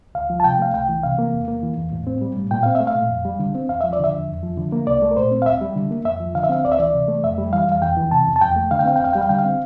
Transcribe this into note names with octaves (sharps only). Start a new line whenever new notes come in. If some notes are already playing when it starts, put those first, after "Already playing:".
D2 F5
F3
A5
C3 G5
A3 F5
C2 G5
E3
C3 F5
A#3
E2
A#3
E3
E2
A2
C4
G3
A2
A#2 G5
C4 F5
E5
A3
F5
A#2
F2
G3
D3
C4
E2 F5
F3 E5
D5
D3 E5
E2
F2
F3
D3
A#3
C2 D5
A3
A#4
A#2 C5
C4
F5
D2 E5
G3
D3
A#3
F2 E5
F3
D3 F5
E5
C4 F5
D2 D5
E5
E3 D5
C3
A3
F2 E5
G3
E3 F5
F2 F5
E2 G5
E3
C3 A5
E2
A5
F2 G5
A3
D3 F5
G5
C4 F5
G5
E2 F5
G3 G5
F5
D3 G5
F5
C4